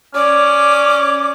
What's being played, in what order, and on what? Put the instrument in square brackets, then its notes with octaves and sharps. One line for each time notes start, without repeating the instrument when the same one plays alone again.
[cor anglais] C#4 [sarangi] D5 [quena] D6